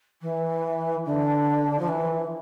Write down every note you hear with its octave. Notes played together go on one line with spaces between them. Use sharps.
E3
D3
F3
E3